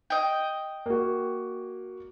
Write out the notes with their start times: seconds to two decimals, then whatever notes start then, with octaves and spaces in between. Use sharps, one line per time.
0.10 D#5 G5
0.86 A#3 F#4